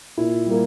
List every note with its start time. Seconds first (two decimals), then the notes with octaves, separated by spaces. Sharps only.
0.18 A#2 E4
0.46 G3 A#3